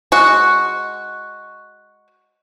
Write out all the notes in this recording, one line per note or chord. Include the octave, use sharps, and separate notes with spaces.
G#3 F#4